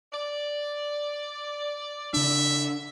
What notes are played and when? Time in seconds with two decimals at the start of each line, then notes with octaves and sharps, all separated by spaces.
0.13 D5
2.14 C#3 D4 E5